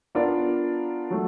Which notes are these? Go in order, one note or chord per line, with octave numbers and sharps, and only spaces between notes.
B3 D4 F4 A#4 D5
F#3 A3